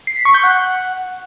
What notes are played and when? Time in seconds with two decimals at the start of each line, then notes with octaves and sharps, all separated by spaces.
0.07 C7
0.16 B6
0.25 C#6
0.34 G6
0.44 F#5